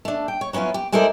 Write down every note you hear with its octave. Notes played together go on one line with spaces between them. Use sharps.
A3 D4
G5
C#5
F#3 B3 C#4 E4 F4
G4
G#3 E4 A4 A#4 C5 D5